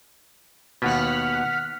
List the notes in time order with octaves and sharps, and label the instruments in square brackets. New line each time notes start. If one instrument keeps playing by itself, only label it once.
[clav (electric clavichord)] D#2 B2 [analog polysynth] F#5 F6 B6